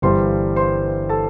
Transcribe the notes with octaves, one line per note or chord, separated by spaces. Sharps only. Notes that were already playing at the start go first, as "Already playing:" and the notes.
G1 G2 E3 G3 C5 C6
C5 C6
A4 A5